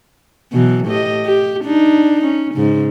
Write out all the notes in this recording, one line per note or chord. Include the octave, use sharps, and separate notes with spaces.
B2 E3 F#3
A2 G4 D#5
G4
D4 D#4
C#4
G#2 C#3